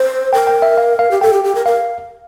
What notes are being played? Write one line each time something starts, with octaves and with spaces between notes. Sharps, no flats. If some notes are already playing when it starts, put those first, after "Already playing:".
Already playing: C5
A#4 G5
G5
E5
F5
F5
G4
A4 G5
G4
G4
A#4
A#4 F5